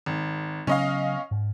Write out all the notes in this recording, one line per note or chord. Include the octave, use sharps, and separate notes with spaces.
G#1
C#3 F#3 B3 C#4 D#5 F5
G#2